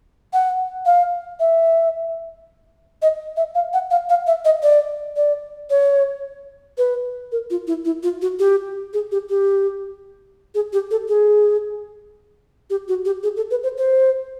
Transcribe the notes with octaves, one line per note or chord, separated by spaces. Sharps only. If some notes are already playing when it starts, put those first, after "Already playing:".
F#5
F5
E5
D#5
E5
F5
F#5
F5
F5
E5
D#5
D5
D5
C#5
B4
A#4
F4
E4
E4
F4
F#4
G4
G#4
G4
G4
G#4
G4
A4
G#4
G4
F#4
G4
G#4
A4
B4
C5
C5